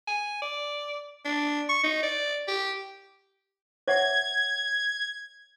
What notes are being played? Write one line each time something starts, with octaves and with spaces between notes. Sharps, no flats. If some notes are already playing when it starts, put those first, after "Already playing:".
G#5
D5
D4
C#6
D#4
D5
G4
C#5 E5 F#5 G#6